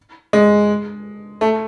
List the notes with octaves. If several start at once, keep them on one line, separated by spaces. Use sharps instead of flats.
G#3
A3